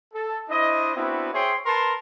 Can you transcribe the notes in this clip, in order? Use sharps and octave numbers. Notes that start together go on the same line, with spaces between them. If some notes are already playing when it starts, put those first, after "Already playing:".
A4
D4 E4 C5 D#5
B3 C4 D4 E4 F#4
G#4 C5 C#5 E5 G5 C6
A#4 B4 A5 C6